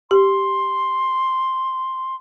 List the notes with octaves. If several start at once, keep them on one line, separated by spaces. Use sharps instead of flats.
G4 C6